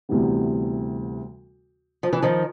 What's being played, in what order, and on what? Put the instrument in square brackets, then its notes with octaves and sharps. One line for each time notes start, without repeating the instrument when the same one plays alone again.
[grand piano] D2 C3 E3 G3 B3
[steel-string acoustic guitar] F3
E3
D#3 F3